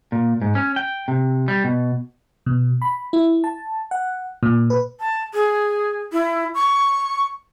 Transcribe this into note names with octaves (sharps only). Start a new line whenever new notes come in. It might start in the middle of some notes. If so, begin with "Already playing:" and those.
A#2
G#2
C#4
G5
C3
G3
B2
B2
B5
E4
A5
F#5
A#2
B4
A5
G#4
E4
C#6